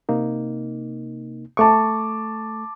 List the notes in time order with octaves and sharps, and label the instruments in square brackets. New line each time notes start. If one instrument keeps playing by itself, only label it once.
[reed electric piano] C3 A#3 D#4
[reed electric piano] A3 C#6 [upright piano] A5 D6